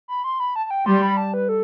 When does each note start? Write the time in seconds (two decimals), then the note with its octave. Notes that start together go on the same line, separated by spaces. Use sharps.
0.08 B5
0.24 C6
0.40 B5
0.56 A5
0.66 A5
0.71 G5
0.86 G3 C6
1.02 B5
1.17 A5
1.34 B4
1.49 A4